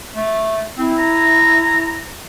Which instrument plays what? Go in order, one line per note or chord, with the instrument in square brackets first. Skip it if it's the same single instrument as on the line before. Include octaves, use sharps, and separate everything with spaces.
[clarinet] A3
[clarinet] C4 [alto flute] E4
[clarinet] A#5